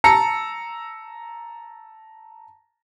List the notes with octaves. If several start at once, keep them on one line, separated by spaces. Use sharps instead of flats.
A5 A#5 E6 A#6 C#7